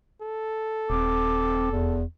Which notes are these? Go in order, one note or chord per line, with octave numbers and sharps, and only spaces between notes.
A4
D#1 C4 D6
E2